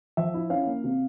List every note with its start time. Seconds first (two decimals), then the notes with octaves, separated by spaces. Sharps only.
0.17 F3 E5
0.34 E4
0.50 C#4 F5
0.66 A#3
0.84 C3